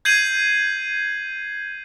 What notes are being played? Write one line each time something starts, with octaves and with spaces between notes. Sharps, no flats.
G6 G#6 C7 D#7 F#7